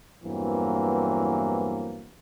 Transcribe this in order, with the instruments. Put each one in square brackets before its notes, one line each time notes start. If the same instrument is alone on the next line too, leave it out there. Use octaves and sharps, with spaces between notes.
[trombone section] E2 G2 E3 F#3 A#3 C4